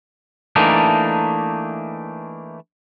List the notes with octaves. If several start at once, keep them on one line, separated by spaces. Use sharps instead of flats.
E3 A3 A#3 D4 D#4